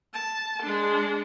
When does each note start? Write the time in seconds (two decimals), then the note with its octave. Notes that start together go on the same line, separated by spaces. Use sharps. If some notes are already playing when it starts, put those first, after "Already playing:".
0.14 A5
0.62 G#3 D4